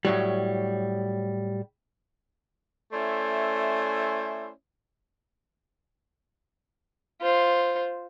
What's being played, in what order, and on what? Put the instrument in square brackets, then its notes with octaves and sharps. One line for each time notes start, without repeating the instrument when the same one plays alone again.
[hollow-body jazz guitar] A2 F#3 G3
[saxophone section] A3 C#4 E4 C5 D5 E5
[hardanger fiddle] F4 C5